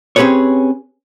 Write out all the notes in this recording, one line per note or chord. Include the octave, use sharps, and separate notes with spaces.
C4 C#4 G4 G#4 B4 C#5